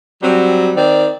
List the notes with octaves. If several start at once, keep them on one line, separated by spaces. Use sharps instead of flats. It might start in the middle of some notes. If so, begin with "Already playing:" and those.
F#3 G3 C4
D#3 C4 D5